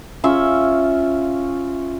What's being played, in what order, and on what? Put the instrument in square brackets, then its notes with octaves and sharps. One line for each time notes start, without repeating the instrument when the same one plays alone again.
[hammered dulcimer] C#4 F4 E5